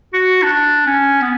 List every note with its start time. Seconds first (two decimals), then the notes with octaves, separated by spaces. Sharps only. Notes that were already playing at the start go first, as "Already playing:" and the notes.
0.13 F#4
0.42 D4
0.86 C#4
1.21 B3